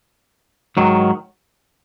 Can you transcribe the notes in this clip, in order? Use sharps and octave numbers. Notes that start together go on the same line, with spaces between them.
G#2 D#3 F#3